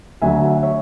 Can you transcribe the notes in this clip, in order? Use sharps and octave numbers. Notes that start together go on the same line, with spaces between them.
D2 D3 F#3 E5 G#5
C#5 E5